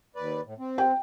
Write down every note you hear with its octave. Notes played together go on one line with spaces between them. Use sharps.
D#2 B4 D5
A2
C4
G5